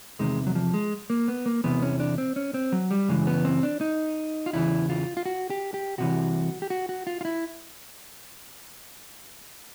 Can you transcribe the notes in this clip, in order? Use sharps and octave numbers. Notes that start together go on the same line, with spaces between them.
E2 C3 D#3 G#3
F#3
F3
G#3
A#3
B3
A#3
E2 C3 E3 B3
C#4
D4
C4
C#4
C4
F#3
G3
F#2 C#3 E3 G#3
B3
C4
D4
D#4
F4
E2 C#3 E3 E4
F4
F4
F#4
G4
G4
C2 C3 E3 F#4
G4
F#4
F#4
F4
F4
E4